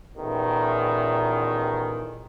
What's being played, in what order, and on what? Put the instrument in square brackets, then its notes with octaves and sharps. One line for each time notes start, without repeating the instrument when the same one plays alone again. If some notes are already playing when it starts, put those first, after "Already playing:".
[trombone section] A1 E2 D#3 [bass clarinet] A#2